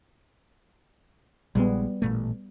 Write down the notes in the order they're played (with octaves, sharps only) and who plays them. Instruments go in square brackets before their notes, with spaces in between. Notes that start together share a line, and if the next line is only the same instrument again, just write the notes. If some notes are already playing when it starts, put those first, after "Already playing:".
[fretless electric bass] A#1 A#2 G#3 [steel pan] G3 B3
[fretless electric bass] A1 A#2 A3